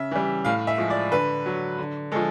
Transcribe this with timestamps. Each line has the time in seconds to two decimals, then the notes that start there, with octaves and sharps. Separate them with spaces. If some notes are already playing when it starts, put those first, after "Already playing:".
Already playing: C#3 E5
0.11 E3 G3
0.45 A2 F5
0.67 E5
0.78 F3 G#3
0.90 D5
1.11 D3 B4
1.46 F#3
1.78 D3
2.12 F3 G#3 A4